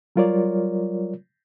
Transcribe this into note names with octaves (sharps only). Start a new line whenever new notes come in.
F#3 G3 F4 A#4 C#5 D5